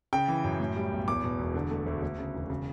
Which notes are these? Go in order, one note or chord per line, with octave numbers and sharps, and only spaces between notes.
C#3 G5
E3
F#2
A2
G3
B1
E2 D6
B2
E1
D3
A3
D2
D2
C#3
E1
C#3